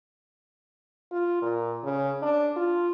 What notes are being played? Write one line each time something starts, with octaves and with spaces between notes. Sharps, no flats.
F4
A#2
C#3
D4
F4